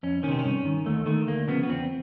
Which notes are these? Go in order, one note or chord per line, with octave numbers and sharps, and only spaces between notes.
F2 C#4
C3 D#3 C4 C#4
C#4
G2
D#3
D#2 A3
D#3 A3
D2 A#3
C#3 F3 B3
B3
E2 C4